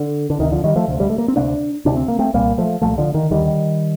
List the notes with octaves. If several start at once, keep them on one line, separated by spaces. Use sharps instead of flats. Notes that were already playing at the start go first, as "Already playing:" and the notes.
Already playing: D3
D3
D2 C3 D#3
D3 F3
D#3 G3
F3 A3
D2 C3
G3
A3
A#3
C4
D2 C3 A#3 D4
D2 C3 D4
C4
A#3
A3 C4
C2 A#2 G3 A#3
F3 A3
C2 A#2 F3 A3
D3 F3
D#3
D#2 D3 D#3 G3